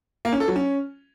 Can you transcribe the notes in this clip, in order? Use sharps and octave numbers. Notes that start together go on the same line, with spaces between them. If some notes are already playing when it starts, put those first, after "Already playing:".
A#3
C#4
A4
F#3
C#4